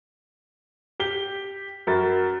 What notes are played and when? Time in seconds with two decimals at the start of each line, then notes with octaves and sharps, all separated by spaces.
1.00 G4 G7
1.87 F#2 A#4 B5 A6